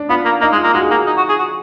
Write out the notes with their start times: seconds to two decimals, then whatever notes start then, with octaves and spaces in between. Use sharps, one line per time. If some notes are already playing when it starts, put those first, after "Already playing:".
Already playing: D4
0.09 B3 F4
0.25 A#3
0.41 A#3 D#4
0.52 G#3
0.58 F4
0.64 A#3
0.74 G#3 F#4
0.82 G#4
0.89 A#3 F#4
1.06 D#4
1.17 F#4
1.29 G#4
1.39 F#4